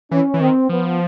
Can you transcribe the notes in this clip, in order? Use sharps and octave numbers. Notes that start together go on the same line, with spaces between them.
E3 C#4
E3
D#3 C4
F3 B3